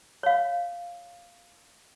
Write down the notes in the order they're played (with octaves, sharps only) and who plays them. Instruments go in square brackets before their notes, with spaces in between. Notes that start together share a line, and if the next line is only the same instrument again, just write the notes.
[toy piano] C#5 F5